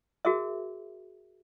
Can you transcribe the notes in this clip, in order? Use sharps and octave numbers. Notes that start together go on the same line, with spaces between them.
F#4 G#4 A#4 E5